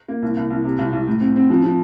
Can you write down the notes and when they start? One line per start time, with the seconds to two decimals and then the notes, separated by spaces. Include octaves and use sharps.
0.08 A#3
0.22 C2
0.37 C2
0.50 C2
0.64 C3
0.79 C2
0.93 C2
1.07 A2
1.21 C4
1.36 C4
1.50 F3
1.63 F3